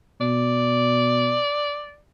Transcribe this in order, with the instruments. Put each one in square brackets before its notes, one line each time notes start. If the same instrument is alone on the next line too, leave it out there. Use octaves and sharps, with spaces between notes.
[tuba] B2 [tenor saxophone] D5